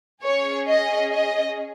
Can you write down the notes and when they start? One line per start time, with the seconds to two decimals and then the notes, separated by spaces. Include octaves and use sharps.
0.24 C#4 G#4 C#5
0.69 D#5
1.12 D#5